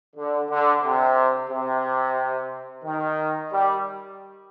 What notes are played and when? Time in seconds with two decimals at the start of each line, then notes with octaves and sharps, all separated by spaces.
0.16 D3
0.50 D3
0.83 C3
1.51 C3
2.85 D#3
3.52 G3